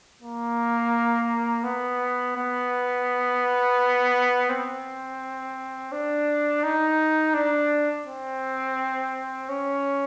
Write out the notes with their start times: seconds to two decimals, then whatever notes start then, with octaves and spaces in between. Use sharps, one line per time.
0.22 A#3
1.64 B3
2.36 B3
4.49 C4
5.92 D4
6.63 D#4
7.34 D4
8.06 C4
9.49 C#4